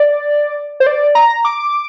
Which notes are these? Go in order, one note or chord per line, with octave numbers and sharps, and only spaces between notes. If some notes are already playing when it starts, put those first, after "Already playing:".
Already playing: D5
C5
D5
A#5
D6